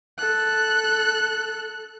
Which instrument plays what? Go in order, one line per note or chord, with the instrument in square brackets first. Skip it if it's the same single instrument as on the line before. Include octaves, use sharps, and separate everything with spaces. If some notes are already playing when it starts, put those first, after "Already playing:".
[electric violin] A4 F#6